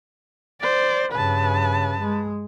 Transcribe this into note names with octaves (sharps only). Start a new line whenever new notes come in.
C5 D5
G2 C#3 B4 A5
G#3